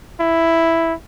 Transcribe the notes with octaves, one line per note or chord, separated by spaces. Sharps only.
E4